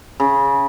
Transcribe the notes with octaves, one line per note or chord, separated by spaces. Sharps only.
C#3